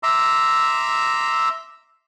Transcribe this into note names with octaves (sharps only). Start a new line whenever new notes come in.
E5 A#5 C6 D6 E6